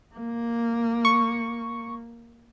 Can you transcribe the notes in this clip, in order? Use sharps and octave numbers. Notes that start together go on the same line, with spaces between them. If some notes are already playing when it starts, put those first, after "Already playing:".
A#3
C#6